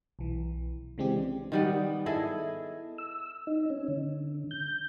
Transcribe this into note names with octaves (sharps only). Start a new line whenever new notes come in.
B1 E3
C#3 E3 G#3 C4 D4 G4
D#3 G3 B3
E4 G#4 A4 D#5
E6
D#4
C#4
D3
G6